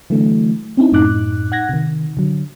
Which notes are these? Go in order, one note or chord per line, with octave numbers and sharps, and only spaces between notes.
D3 E3 F#3 A3
C4 C#4 D#4 E4
F#2 A2 D#4 D6 F#6
F#5 F#6 G#6 A#6
C3 D#3
D3 F#3